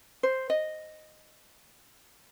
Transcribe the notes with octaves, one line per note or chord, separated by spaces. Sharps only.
C5
D#5